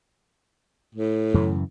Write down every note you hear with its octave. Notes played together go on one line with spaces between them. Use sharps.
A2
F#2 C#3 E3